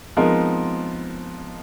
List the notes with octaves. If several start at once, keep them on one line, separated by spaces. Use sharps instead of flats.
F3 G#3 B3 C4 D#4 A#4